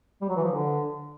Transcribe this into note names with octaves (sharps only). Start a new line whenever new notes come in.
G3
F#3
E3
F3
D3